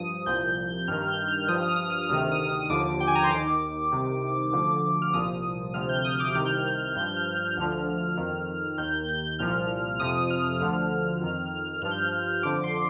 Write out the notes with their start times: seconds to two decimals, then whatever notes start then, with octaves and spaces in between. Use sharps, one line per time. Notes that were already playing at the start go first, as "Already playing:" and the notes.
Already playing: G2 F3 D#6
0.26 C2 A#2 F3 G6
0.88 G2 D#3 F6
1.08 G6
1.28 F6
1.48 G2 F3 D#6
1.62 F6
1.76 D#6
1.90 F6
2.04 D#6
2.09 D2 C3 D#3
2.18 F6
2.32 D#6
2.66 D#6
2.69 D#2 D3 F3 D6
3.00 G5
3.07 G#5
3.15 A#5
3.24 C6
3.30 D#2 D#3 D6
3.92 C2 C3 D#3
4.52 D2 D3 F3
5.02 F6
5.13 C2 A#2 F3 D#6
5.74 D2 C3 F3 F6
5.89 G6
6.05 D#6
6.20 D6
6.34 C2 C3 D#3 F6
6.45 G6
6.56 F6
6.68 G6
6.80 F6
6.95 G2 F3 G6
7.16 F6
7.37 F6
7.57 D2 D3 F3
8.17 F2 D#3
8.78 D#2 D#3 G6
9.09 G6
9.39 C2 A#2 F3 F6
10.00 F2 C3 F3 D#6
10.18 D#6
10.30 F6
10.60 D2 D3 F3
11.21 F2 D#3
11.82 G2 F3 F6
11.91 G6
11.99 F6
12.13 F6
12.43 F2 D3 F3 D6
12.64 C6